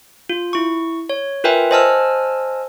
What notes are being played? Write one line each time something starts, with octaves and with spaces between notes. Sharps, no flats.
F4
E4 C#6
C#5
F4 A#4 B4 E5 G5 G#5
C5 D#5 G#5 A5 E6 F6